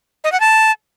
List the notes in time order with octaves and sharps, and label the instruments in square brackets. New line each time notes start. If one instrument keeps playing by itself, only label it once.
[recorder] D#5
F#5
A5